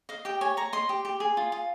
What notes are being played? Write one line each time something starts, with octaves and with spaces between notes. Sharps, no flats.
D#5 F5
G4 G5
C#5 G#5
C#5 A#5
D#5 C6
G4
G4
G#4
F4
F4